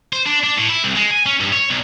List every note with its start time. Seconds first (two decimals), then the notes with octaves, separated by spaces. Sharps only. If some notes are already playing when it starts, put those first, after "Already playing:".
0.13 C5
0.26 D4
0.43 D4
0.57 A2
0.69 E4
0.84 C2
0.96 G#3
1.11 G#5
1.26 C#4
1.40 G2
1.52 C#5
1.70 B1